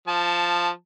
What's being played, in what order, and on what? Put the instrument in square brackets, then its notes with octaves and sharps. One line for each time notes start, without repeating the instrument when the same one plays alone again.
[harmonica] F3 A5